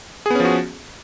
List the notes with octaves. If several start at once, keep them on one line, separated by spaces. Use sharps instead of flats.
F3 B3 C#4 F#4 G#4